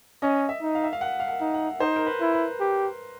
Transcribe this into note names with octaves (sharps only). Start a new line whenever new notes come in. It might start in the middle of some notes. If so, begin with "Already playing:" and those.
C#4 D#5
E5
D#4
F5
E5
F5
F#5
F5
F#5
D#4
F#5
D#4 C5
A#4
B4
E4
B4
G4